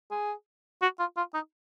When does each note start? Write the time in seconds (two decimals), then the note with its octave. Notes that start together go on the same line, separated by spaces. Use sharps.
0.11 G#4
0.82 F#4
0.99 F4
1.17 F4
1.34 D#4